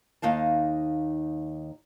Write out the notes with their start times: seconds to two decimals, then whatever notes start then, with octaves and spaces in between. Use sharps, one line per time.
0.22 D#2 D#4 F5 A5